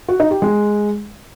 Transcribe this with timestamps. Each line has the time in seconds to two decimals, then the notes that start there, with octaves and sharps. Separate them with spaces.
0.08 F#4
0.20 D#4
0.31 G4
0.42 G#3